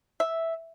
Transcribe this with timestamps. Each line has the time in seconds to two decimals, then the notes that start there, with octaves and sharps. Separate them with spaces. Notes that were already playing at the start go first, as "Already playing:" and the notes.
0.20 E5